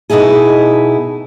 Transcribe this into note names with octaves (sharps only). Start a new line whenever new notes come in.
B2 A3 D#4 E4 G#4